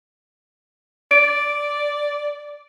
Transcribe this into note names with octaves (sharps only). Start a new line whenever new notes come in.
D5 D7